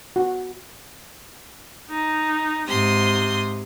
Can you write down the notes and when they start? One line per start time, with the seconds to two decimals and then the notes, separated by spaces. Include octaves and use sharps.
0.16 F#4
1.89 D#4
2.67 G#2 C3 C6 D#6